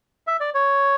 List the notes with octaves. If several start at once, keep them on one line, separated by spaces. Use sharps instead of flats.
E5
D5
C#5